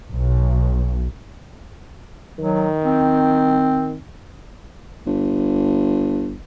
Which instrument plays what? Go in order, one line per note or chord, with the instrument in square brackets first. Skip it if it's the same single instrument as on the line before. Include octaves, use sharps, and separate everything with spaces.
[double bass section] B1
[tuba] D#3 [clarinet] F#3
[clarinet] C4
[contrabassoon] G1